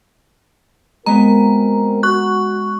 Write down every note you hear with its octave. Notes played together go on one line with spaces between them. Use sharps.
G#3 B3 C4 F#4 A#4 A#5
F#4 C#6 F#6